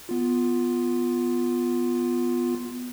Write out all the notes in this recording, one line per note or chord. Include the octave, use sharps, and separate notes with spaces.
B3 F4